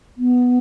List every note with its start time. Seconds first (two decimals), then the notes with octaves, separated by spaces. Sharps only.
0.17 B3